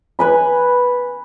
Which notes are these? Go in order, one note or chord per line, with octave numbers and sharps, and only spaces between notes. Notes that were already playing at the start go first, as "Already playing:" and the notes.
B4 G#5 B5